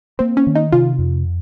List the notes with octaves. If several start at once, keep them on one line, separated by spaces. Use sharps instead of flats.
A#3 C4
C#4
D#3
D#4
C3 F4
F2